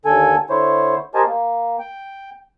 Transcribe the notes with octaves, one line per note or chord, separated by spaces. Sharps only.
D#2 D3 A4 G#5
D3 E4 C5 C#5
G4 A#4 C5 D#5 G#5 A5
A#3
G5